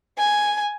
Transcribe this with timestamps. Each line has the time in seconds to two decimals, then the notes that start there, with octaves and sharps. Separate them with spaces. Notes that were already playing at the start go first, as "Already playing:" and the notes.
0.18 G#5